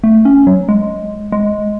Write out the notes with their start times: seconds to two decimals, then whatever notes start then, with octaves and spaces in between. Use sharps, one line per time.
0.04 A3
0.25 C#4
0.47 F#3
0.69 G#3
1.32 G#3